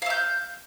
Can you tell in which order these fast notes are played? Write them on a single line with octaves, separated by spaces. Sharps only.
F5 E5 G6